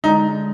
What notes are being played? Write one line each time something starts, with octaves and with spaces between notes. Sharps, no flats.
D3 G#3 D#4